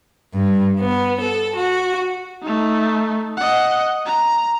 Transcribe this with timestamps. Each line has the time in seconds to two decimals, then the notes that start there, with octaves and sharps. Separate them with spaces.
0.34 G2
0.80 B3
1.20 A4
1.56 F#4
2.42 A3 D#4
3.37 D#5 F#5
4.06 A#5